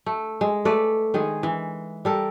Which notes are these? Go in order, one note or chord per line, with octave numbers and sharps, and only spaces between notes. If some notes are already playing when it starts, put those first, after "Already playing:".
A3
G#3
A3 B4 D5
D#3 G#3 G#4
E3
G3 A4 A#4